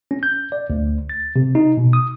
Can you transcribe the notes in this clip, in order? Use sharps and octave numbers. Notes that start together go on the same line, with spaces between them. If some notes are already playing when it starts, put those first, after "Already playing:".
C#4
G6
D5
D2
A6
C3
D#4
B2
D#6